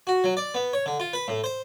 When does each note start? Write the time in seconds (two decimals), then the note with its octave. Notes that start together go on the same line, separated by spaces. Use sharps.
0.07 F#4
0.24 F#3
0.37 D5
0.54 B3
0.73 C#5
0.86 D3
1.00 F4
1.13 B4
1.28 A2
1.44 C5